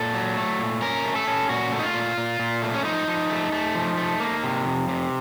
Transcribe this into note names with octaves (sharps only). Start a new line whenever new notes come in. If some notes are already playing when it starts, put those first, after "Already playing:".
Already playing: A#2 A4
F#3
A3
A#2
C#4 A#4
A3
A4
C#4
A#2 F#4
A3
D#4
F4
A#2
A#2
A#2
A3
C#4
F3 D#4
F3
A3
A3
F3
A3
A#3
C3
F2
C3